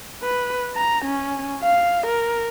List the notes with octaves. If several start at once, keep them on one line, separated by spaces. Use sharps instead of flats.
B4
A#5
C#4
F5
A#4